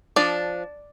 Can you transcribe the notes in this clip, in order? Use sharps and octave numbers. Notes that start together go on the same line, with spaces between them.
F3 D4 D5